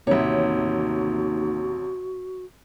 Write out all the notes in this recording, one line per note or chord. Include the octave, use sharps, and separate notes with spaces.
A1 D#2 C3 F#4 C#5 E5